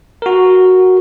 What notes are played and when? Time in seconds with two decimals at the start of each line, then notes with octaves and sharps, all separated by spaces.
0.22 F#4 A#4